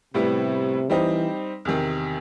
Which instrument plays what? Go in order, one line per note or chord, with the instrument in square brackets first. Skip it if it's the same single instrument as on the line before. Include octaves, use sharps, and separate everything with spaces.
[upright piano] A2 G3 B3 E4 [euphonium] C3
[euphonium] E3 [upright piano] G3 C4 D#4
[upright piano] E2 C3 D#3